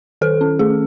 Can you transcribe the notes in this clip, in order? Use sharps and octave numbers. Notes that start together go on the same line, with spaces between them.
D#3 A4
C#4
A3 G#4